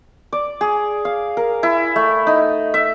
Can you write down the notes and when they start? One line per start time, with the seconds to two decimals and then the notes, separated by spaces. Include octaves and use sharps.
0.33 D5
0.61 G#4
1.05 F5
1.37 A#4
1.63 E4
1.96 A3
2.27 D#4
2.74 E5